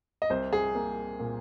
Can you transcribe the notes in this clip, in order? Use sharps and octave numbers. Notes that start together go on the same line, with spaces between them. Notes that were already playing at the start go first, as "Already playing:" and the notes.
D#5
C2 C5
G#4
A#3
A#2